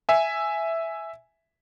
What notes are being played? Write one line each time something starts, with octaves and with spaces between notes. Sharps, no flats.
E5 G#5